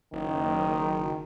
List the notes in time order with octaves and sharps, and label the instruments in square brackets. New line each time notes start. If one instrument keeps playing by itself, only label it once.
[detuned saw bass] F#1 [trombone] D#3